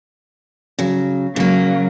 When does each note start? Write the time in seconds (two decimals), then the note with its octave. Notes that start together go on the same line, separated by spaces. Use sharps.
0.79 C#3 F#3
1.36 C#3 F#3 A#3